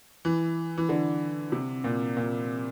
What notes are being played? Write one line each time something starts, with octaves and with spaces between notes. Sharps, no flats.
E3
E3
D3
C3
A#2
A#2